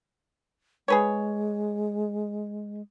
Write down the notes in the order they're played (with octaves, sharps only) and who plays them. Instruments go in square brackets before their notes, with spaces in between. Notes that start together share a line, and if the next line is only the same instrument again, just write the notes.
[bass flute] G#3 [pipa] G#4 B4 C#5